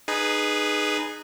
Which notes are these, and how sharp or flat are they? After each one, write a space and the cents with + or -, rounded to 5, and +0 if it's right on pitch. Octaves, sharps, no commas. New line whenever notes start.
D#4 -25 G#4 +0 B4 +0